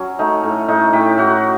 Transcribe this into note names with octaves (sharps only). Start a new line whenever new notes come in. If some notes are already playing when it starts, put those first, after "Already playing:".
Already playing: F#3 C#4
A3 D#4
A2
A2 D#4
A2 G4
A2 F#4